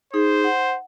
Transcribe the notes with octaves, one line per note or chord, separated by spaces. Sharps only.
D#4 G#4 C5
F#5